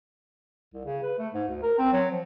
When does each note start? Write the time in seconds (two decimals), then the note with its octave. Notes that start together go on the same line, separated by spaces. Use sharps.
0.73 C2
0.85 C#3
1.03 B4
1.18 A3
1.34 G#2
1.48 D2
1.62 A#4
1.78 C4
1.92 F#3
2.11 F3